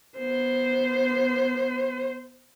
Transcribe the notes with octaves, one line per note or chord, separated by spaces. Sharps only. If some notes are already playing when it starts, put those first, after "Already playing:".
B3 C5